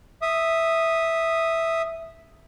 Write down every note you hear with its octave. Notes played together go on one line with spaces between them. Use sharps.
E5 D#6